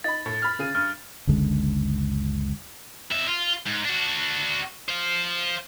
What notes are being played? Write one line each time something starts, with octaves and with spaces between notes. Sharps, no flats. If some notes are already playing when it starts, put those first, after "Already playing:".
D#4 B5 A6
A2
B5 F6
C#3 G#4 D#7
G2 F6
F#1 C#2 D3 G#3
F2 E5
F4
G#2
D4 F#4
C5 F5